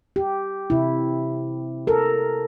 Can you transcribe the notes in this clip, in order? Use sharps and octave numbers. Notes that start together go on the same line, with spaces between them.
G4
C3 E4
A4 A#4